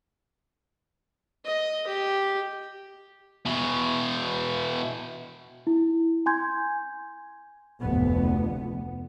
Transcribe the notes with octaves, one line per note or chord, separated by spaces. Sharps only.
D#5
G4
B2 E3
E4
G#5 C6 G6 G#6
F1 D2 B3